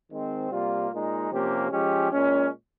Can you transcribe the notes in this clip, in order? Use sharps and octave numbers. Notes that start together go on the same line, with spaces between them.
D#3 G#3 C4
C3 G3 A#3 F4
A#2 G#3 D#4
C3 F3 A#3 C#4 G4
F3 G#3 C#4 G4
A#2 G#3 C#4